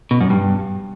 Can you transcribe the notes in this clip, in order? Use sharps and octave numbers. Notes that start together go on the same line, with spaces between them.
B2
F#2
G2